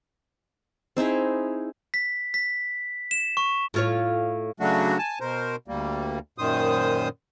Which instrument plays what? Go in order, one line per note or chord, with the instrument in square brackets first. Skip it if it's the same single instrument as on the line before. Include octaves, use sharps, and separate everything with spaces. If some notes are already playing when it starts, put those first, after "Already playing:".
[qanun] C4 D#4 E4 G#4
[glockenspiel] B6
B6
E7
C#6
[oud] A2 F4 C#5
[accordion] C#3 F#3 A3 D4 F#4
G#5 A5
B2 A#4 C5
D2 G3 A#3
F#2 A#2 D#3 C5 D#6